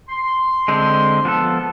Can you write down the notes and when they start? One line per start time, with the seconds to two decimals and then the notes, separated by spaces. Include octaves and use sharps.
0.09 C6
0.68 D3 G#3 C4
1.25 F3 B3 A4